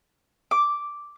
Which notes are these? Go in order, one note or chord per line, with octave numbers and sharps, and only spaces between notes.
D6